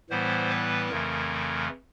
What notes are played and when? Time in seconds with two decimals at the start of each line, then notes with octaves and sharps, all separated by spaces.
0.10 A2 E3 G3 B3 C5
0.50 B4
0.89 F2 C#3 E3 A3 A#4